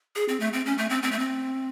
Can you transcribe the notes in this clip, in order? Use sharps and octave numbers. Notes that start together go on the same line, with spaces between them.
G#4
C4
A3
C4
C#4
A3
C4
C4
A3
C4